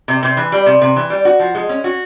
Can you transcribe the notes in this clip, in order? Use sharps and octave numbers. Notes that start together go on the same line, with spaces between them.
C3
C3
E3
G3
C3
C3
E3
G3
F#4
F3
G#3
C#4
F#4